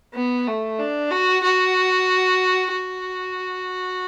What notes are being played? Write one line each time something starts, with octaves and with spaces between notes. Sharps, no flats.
B3
A3
D4
F#4
F#4
F#4